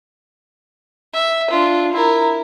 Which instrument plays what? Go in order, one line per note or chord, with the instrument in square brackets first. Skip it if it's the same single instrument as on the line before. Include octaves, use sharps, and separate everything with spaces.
[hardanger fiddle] E5
D4 F4
E4 A#4